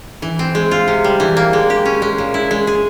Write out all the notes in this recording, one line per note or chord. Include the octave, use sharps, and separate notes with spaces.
E3
C4
G#3
F4
C3
G3
E3
A#3
G#3
G4
C#4
G#3
A#2
E4
G#3
G#4